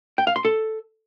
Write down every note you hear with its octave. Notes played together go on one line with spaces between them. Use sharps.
G5
F5
C6
A4